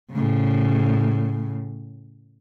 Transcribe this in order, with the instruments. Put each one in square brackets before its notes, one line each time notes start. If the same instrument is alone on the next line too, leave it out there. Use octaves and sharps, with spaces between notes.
[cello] A2 C#3